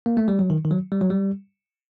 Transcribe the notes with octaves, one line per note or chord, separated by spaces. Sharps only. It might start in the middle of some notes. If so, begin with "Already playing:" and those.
A#3
A3
G3
F#3
D#3
D#3
F#3
G3
F#3
G3